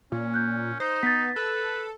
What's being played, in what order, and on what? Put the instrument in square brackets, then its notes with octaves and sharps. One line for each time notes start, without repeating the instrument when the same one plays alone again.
[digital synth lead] A#2 [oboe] C#4
[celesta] F#6 G6
[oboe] D#4 [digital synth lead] C5
[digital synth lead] B3 [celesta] A6 B6
[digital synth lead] A4 [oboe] B4